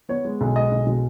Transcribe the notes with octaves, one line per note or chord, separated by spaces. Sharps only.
B3 C#5
G#3
B1
G#3 D#5
B1
B2